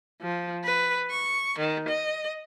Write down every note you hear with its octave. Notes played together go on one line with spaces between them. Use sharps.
F3
B4
C#6
D#3
D#5